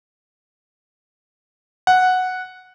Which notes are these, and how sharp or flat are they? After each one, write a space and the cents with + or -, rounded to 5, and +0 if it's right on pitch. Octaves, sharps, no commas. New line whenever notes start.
F#5 -5